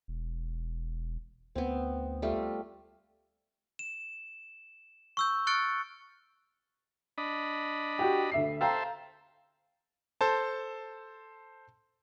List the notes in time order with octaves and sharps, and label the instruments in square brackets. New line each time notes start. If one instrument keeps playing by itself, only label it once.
[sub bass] E1
[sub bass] D2 [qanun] B3 C4
[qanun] G3 A3 F4
[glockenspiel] E7
C#6 E6 G6
C#6 F6 F#6 A6 C#7 D7
[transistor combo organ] D4 D#5 B5
[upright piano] F#4 G4
D2 E5 C7
[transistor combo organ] A4 C5 E5 [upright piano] F5 G5 A#5
[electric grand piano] A4 C5 A5